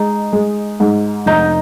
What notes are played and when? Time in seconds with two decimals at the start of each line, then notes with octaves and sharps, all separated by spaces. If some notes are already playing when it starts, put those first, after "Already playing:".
Already playing: G#3 D#4
0.33 G#3
0.80 G#2
1.26 F1 D#4